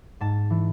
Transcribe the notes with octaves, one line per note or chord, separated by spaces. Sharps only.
G#2 A5
E3